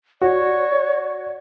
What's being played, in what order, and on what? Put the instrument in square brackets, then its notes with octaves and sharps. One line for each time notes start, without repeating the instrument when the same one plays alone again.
[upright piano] F#4 [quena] C#5 [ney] D5